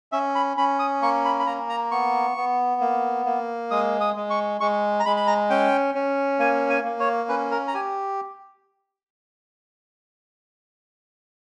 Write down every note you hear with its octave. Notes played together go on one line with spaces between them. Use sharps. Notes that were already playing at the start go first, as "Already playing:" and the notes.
C#4 E5
B5
C#4 B5
D#6
A#3 C#6
B5
B5
A#3 A#5
A#5
B3 C#6
B3
A#3
A#3
G#3 D#6
D#6
G#3
C#6
G#3 C#6
A#5
G#3 B5
B5
A#5
C#4 G5
C#4
A#3 G#5
G#5
A#3
C#5
C#4 B4
A#4
A#5
G4 G#5